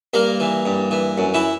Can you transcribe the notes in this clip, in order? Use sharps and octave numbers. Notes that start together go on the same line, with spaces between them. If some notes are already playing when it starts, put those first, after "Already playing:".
G2 A#3 A#4
E3
G2
E3
F#2
E3 E4